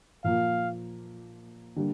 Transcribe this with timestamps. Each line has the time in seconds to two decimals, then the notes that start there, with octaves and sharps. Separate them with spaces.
0.24 A#2 F3 A#3 F4 F5
1.76 D3 G3 A#3